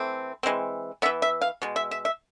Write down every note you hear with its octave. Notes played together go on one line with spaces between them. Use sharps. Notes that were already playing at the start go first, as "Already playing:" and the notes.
Already playing: E3 A3 C4
E3 G#3 C4
E3 B3 E5
E5
F5
B2 G#3
E5
E5
E5